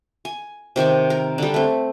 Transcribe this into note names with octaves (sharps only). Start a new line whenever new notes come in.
G#5
C3 D#3 C4 C#6
A#4
D3 G3
A3 C4